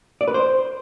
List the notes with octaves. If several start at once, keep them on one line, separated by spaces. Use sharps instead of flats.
D5
B4
C5